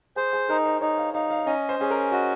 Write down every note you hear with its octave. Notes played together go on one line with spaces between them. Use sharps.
G#4 C5
G#4
D#4 A#4
C5
D#4 C#5
F5
D#4 F5
F5
C#4 D#5
C5
C#4 G#4
A#4
F#4 D#5